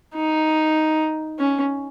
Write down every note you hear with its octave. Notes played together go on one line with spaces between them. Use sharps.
D#4
C#4